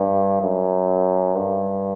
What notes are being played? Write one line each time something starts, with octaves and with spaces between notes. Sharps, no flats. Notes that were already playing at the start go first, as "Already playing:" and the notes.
Already playing: G2
F#2
G2